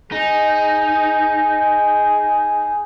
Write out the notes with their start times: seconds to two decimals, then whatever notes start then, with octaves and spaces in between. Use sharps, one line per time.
0.12 D#4 G#4